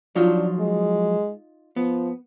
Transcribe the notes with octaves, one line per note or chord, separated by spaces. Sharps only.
F3 F#3 D4 D#4 F4
G#3
F3 B3